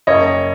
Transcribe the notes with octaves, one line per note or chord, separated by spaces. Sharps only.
F#1 C#5 D#5